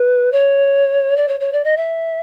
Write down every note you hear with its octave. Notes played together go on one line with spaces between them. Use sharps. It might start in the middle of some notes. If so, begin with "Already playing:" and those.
Already playing: B4
C#5
D5
C#5
C#5
D5
D#5
E5